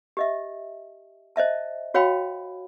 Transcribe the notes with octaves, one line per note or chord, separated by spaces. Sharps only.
G4 D#5 E5
C5 D#5 E5 A5
F#4 C#5 F5 G5 B5